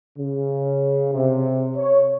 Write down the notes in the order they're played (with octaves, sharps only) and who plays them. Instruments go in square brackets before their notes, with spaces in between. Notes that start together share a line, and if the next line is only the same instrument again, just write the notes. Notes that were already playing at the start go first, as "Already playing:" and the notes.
[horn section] C#3
C3
C#5